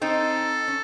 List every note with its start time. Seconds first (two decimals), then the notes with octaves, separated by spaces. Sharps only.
0.02 C4 D#4 A4
0.68 C#4